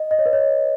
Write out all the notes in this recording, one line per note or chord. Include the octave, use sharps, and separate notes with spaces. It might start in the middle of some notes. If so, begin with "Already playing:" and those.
Already playing: D#5
D#5
C#5
B4
C#5